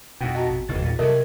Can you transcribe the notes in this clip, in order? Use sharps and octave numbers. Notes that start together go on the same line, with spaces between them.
F2 B2 D#4 F#5 G5
F#4 D#5 F#5 A5 A#5
A1
F#1 E2 E3 D#4 A6
A#1 A#2
C3 E3 F#3 A4 A#4 D#5 E5